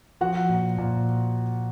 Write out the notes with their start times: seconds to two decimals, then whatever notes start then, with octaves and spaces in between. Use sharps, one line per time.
0.21 F3 F#4 F#5
0.49 A#2
0.78 A#2